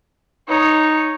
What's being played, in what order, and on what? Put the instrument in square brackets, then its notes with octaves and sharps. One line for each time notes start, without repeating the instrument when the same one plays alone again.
[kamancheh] D#4 C#5